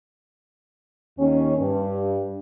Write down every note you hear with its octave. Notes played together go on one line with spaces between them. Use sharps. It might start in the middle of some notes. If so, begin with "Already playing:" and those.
D#2 C#4
G2